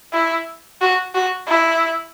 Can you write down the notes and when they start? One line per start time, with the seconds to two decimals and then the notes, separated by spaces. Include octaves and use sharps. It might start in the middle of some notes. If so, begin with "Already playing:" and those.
0.13 E4
0.81 F#4
1.14 F#4
1.48 E4